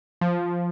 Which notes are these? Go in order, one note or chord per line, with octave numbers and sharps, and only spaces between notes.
F3